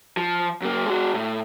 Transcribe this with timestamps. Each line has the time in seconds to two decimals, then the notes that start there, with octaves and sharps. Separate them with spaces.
0.17 F3
0.62 F#2 A#3
0.86 G#3 F#4
1.14 A2